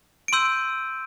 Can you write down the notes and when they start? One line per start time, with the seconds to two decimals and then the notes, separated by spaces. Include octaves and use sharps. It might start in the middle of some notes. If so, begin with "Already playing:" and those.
0.28 D7
0.33 C6 E6 G6 D#7